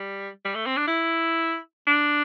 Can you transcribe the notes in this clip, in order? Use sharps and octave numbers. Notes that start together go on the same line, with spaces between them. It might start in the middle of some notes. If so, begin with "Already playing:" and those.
Already playing: G3
G3
A3
C4
D4
E4
D4